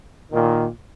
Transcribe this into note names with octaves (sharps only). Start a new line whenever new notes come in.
A#2 D#3